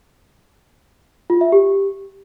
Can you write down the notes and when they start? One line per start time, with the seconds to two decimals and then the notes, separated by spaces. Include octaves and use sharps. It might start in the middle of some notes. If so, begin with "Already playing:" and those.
1.30 F4
1.41 E5
1.52 G4